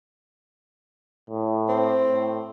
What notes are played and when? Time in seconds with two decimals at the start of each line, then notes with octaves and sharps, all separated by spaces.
1.30 A2
1.68 C4
2.09 A2